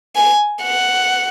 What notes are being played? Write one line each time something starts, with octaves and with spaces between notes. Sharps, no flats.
G#5
F#5